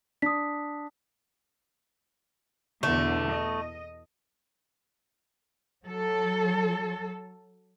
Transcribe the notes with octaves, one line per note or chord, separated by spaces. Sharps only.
D4 D#6 B6
E2 B2 D3 A3
D#5
F#3 A4